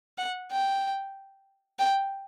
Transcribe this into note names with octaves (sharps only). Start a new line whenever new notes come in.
F#5
G5
G5